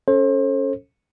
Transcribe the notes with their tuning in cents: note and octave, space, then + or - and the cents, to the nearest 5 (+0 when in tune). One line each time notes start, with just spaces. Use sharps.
C#4 +0 A4 +0 C5 +40